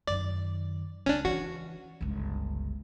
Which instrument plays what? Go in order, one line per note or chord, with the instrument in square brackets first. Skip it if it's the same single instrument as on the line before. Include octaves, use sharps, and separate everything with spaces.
[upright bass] F#2 D#3 [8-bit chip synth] D5
[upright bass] C#2 [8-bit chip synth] C#4 D4
[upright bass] E3 [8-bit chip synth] F#4
[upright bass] G1 C#2